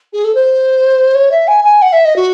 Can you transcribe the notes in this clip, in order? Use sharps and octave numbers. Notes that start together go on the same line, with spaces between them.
G#4
A4
C5
C#5
E5
G#5
G#5
F#5
E5
D#5
F#4